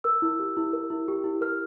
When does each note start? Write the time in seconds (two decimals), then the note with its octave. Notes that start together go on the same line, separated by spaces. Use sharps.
0.04 A#4 E6
0.22 E4
0.40 G4
0.57 E4
0.73 A#4
0.90 E4
1.08 G4
1.24 E4
1.41 A#4 F6